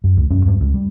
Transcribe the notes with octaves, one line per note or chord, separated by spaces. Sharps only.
F#2
C#2
E1 F#2 C#4
E2 G2
C#2
G3